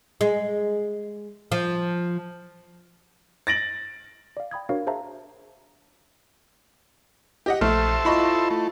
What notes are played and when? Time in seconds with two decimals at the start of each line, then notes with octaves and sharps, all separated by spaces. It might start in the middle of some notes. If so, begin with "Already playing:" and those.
0.21 G#3
1.52 F3
3.47 A6 A#6 D7 F#7
4.37 D5 F5
4.51 G5 B5 D#6 G#6
4.69 D4 F#4 A#4 C5 C#5 F5
4.87 G#4 C5 E5 F5 A5 A#5
7.46 G4 D#5 F#5
7.61 A#1 A3 A4 C5 E5 F6
8.05 E4 F4 D#5 B5 C#6
8.50 A3